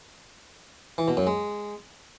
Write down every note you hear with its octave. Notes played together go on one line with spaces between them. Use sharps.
E3
B2
F#2
G#3